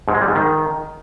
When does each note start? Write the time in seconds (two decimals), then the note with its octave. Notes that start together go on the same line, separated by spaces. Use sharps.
0.08 G#2
0.15 G#3
0.21 G3
0.28 G#2
0.35 D#3